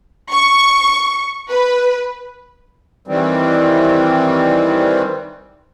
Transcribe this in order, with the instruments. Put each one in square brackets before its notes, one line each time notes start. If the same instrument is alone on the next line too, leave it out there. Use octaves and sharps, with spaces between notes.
[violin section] C#6
B4
[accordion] D#3 E3 G3 C4